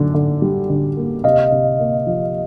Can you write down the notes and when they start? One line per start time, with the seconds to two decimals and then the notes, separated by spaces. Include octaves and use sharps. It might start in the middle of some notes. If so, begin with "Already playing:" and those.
Already playing: F#2 D3
0.14 D3
0.42 G3
0.70 D3
0.97 A#3
1.24 C3 D#5 F5
1.52 C3
1.79 A#3
2.07 F3